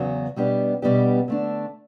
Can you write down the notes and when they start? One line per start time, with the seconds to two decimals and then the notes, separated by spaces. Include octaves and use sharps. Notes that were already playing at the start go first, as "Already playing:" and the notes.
Already playing: E2 C#3 F#3 B3 F#4
0.36 B2 G3 B3 D4 G4
0.82 B2 G3 B3 D4 G4
1.28 D3 A3 D4